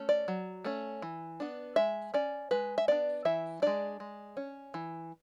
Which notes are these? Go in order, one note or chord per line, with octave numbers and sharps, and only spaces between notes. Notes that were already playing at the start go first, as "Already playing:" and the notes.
Already playing: A3 C#4
D5
F#3
A3 C#4
E3
B3 D4
G#3 E5
C#4 D5
G#3 B4
E5
B3 D4 D5
E3 E5
G#3 D4 D5
G#3
C#4
E3